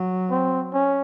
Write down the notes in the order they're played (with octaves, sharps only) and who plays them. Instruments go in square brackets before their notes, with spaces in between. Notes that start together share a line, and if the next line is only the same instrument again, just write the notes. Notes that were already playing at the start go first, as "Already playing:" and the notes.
Already playing: [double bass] F#3
[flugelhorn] C4
C#4